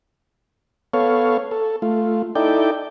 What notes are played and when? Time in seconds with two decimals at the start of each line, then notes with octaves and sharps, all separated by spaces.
0.94 B3 A4 C#5 F5
1.51 A4
1.82 A3 F4
2.35 D#4 E4 A4 D5 G5